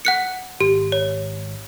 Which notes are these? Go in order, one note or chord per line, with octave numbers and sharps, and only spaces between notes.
F#5 F#6 C#7
G#1 G4
C#5